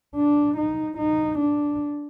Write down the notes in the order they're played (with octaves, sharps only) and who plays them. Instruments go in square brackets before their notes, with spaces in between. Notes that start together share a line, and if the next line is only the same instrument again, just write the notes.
[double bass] D4
D#4
D#4
D4